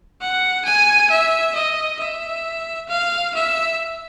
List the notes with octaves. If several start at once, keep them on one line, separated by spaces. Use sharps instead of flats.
F#5
G#5
E5
D#5
E5
F5
E5